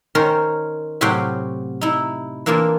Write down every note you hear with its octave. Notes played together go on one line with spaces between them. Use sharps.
D#3 C#4 A#4 C5 C#5
A2 C3 F#3 F#4 F5 G5
D#4 E4
E3 A#3 D4 F4